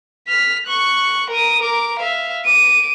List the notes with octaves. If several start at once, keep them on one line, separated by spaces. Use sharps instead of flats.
F6 B6
C#6 F#6
A#4 D#6
A#4 D6
E5 F5
D6 D#7